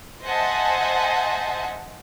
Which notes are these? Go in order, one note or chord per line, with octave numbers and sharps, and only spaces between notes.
C5 D#5 E5 F#5 G#5 A5